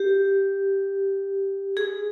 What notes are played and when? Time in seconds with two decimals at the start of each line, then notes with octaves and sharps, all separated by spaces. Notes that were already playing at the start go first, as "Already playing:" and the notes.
Already playing: G4
1.77 G#4